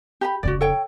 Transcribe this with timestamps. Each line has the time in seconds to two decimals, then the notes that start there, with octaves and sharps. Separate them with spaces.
0.21 G4 A#5 B5
0.43 F1 C#3 F#4 D5
0.61 A4 C#5 G5